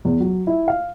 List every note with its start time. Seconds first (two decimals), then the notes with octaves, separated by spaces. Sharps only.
0.05 E2
0.20 F#3
0.47 E4
0.68 F5